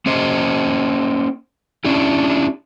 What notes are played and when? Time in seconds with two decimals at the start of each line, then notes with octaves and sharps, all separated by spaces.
0.06 A#3 C#4 C5 D#5
1.84 C#4 D4 E4 G4